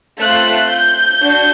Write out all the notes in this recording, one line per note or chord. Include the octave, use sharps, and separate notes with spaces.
A3 C4 F4 F#6
G6
D4 F#4